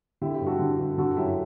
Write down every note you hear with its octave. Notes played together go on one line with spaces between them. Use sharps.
D3 E4 G4
E4 G4
G2
F#4 A4
D3
G2
D3 F#4 A4
F#2 E4 G4